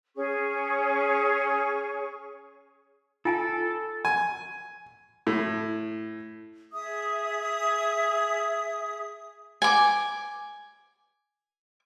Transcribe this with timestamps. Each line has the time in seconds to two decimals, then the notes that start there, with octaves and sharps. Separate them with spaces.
0.16 C#4 G#4 C#6
3.25 F4 A4 G#5 A5
4.05 G#5
5.27 A2
6.72 G#4 E5 D#6
9.62 G#5 D6